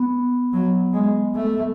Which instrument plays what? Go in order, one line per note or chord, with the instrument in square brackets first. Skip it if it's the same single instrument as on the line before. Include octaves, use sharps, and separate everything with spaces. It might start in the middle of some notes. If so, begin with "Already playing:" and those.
Already playing: [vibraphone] B3
[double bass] F#3
G#3
A3